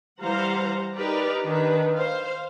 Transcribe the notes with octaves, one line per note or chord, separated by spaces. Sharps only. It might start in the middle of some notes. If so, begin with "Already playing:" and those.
E3 G3 C5 F5 F#5 A#5
D#4 G4 A#4 B4 D5
D#3 D4 B4
C5 F5